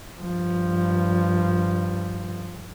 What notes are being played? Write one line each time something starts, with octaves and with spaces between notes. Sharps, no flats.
G2 F3